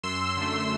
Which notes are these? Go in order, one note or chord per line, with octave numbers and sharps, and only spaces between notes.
F#2 C6 E6
D3 A3